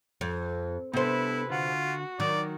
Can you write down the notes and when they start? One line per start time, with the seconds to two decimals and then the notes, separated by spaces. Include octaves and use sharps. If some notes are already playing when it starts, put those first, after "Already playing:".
0.21 F2
0.93 C3 B3 D4 E4 A4 B4 C5
1.50 D3 F4 F#4 F#5
2.20 D#3 F#3 D5